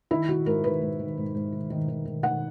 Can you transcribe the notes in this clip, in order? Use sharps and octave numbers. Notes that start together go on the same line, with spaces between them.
D#3 E4
D#3 F#4
G#2 A#4
D#3 B4
G#2
D#3
G#2
G#2
D#3
D#3
D#3
D#3
D#3 F#5